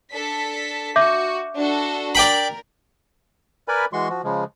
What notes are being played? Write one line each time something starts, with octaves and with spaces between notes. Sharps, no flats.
D4 A4 B6
F#4 E5 D6 G6
D4 F#4 A4
A#4 D5 G5 B5
A#4 B4 D5 G#5 B5
E3 G#3 F#4 C6 C#6
F3 F#4
C#3 F3 G#3